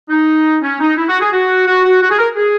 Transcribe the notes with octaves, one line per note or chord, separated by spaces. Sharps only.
D#4
C#4
D#4
E4
F#4
G#4
F#4
F#4
F#4
F#4
G#4
A#4
G#4